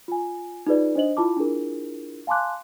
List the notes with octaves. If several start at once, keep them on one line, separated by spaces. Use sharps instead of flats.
F4 G#5
D#4 F4 G#4 B4 D5
D4 C5 D#5 F#7
E4 F4 A5 D6
D4 E4 F4 G#4 A#4
F5 G#5 A5 C6 D6 F#6